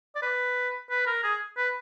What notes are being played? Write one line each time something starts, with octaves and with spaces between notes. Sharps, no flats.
D5
B4
B4
A#4
G#4
B4